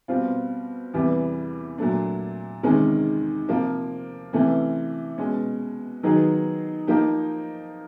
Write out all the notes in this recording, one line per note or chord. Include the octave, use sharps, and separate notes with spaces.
B2 G3 C4 F4
E2 C3 E3 G3 B3
A#2 F#3 A3 D4
E2 C3 D#3 G#3 C#4
C3 F3 A#3
C3 E3 A3 C#4
B2 G#3 C#4
D#3 F#3 B3 D#4 G#4
F3 A#3 D#4 G4